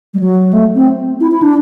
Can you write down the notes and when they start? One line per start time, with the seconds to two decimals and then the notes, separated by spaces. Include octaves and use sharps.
0.14 G3
0.20 F#3
0.53 A3
0.75 C4
1.20 E4
1.31 E4
1.42 D4